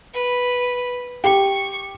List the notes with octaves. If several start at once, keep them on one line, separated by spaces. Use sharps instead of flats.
B4
G4 C#6